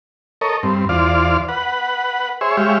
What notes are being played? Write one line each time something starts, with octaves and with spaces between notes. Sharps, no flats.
A4 A#4 C#5 D#5
G2 C4
E2 F4 C5 D5 F5
B4 F#5
G#4 C5 C#5 E5
G#3 G4 C#5 E5 F5